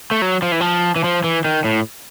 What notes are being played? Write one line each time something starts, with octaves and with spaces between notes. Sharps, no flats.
A3
F#3
F3
E3
F3
E3
F3
E3
D#3
A2